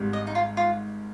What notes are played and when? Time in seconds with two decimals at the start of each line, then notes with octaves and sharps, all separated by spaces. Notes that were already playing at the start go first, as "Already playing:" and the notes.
Already playing: G#1 G#2 G3
0.13 D#5
0.27 D#4
0.35 F4
0.57 F4